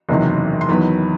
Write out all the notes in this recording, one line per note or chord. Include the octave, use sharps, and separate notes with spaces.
F#1 E2 C3 D#3 F#3
C6
E2 D#3 F#3 B3 B5